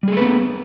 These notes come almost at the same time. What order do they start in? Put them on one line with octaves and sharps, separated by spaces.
G3 G#4 A3 B4 B3